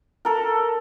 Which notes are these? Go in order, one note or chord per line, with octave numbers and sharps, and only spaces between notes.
A4 A#4